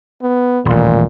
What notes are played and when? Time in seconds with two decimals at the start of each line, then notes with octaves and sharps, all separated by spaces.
0.22 B3
0.65 D#1 A1 A#2